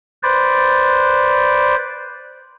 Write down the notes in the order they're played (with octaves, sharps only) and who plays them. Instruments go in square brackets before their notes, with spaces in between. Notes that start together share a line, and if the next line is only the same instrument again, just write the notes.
[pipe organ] B4 C5 D5